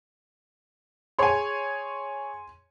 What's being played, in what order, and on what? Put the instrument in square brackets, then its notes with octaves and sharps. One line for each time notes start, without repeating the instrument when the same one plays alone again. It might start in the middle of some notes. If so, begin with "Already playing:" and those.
[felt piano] G#4 C#5 [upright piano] G#5 C6